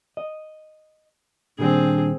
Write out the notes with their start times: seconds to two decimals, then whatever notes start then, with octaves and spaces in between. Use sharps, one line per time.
0.17 D#5
1.59 A#2 D#3 G3 C4 D4 G#4